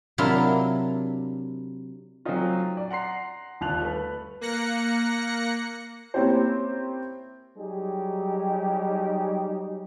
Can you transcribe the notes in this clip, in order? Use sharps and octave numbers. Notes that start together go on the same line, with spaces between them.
C3 F#3 D4 E4 F4 A#4
F#3 A3 C4 C#4 D#4 F4
D5
F#5 A#5 C6 C7
G1 D#2 F4 A5 F#6 F7
A3 B4
A#3 F#6 A#6 C#7
A#3 C4 C#4 E4 G4 C5
F#3 G3 D#4 G4 G#4